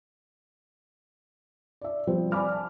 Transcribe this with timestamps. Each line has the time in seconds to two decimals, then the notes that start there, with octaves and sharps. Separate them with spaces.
1.81 D5 E5
2.07 F3 G3 C4
2.32 D5 G#5 B5 D6 F6
2.52 A5